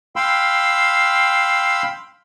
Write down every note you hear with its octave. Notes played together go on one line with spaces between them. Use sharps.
F5 G5 B5 C6 E6